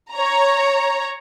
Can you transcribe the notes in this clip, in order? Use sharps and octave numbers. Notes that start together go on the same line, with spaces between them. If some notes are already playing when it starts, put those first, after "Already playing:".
C#5 A#5